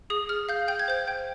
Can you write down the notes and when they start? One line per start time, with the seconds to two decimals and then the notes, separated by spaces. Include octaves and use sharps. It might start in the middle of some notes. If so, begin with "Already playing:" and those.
0.10 G#4 D#6
0.29 G#4 F6
0.49 F5 G6
0.68 G5 G6
0.79 G#6
0.88 C5 G6
1.08 G5